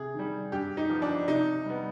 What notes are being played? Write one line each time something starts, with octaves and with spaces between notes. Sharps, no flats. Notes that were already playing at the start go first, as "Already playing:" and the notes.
Already playing: C3 G#4
D#3 G3
G2 G4
D#4
F3 B3
D4
C3 D#4
G3 B3